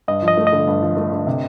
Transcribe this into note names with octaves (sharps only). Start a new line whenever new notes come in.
G2 D#5
F3
D#5
A3
D#5
D3
G2
F3
A3
D3
C3